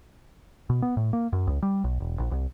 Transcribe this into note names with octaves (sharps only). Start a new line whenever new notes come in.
B2
B3
A2
A#3
F#2
C#2
G3
B1
E1
A#1
C2